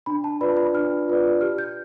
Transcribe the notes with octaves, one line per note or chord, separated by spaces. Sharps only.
D4 B5
A5
F4 B4 D5 B5
B5
D4 F6
F4 B4 D5
G4 F6
G6